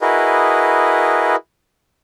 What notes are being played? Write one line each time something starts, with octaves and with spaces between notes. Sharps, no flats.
E4 F#4 G#4 A#4 B4 D#5